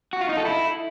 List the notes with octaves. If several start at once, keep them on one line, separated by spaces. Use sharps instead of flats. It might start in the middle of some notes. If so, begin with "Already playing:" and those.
F#4
F4
D#4
A4
E4